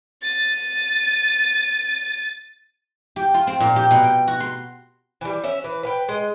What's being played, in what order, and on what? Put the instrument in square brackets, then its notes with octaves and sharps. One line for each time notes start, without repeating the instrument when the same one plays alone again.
[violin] A6 D#7
[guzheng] G4
F4
C4
A#2
G4
B2
G5
F#4
C6
[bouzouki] E3 G3
C#4 E5
E3 B4
B4 F5 G5
G#3 D#5